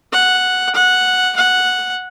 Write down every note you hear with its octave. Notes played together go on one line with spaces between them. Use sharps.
F#5
F#5
F#5